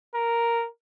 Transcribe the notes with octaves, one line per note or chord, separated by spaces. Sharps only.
A#4